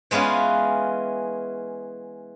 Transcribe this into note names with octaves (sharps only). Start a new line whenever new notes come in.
E3 G#3 B3 C#4 F4